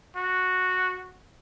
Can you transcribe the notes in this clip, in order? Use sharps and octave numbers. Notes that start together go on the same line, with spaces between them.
F#4